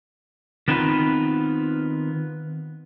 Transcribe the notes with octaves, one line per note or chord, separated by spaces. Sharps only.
D#3 B3 C4 D#4 F4 B4